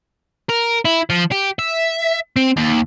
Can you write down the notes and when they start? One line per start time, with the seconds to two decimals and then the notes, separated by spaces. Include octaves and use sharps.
0.49 A#4
0.85 E4
1.10 F3
1.32 G4
1.59 E5
2.36 C4
2.57 D#2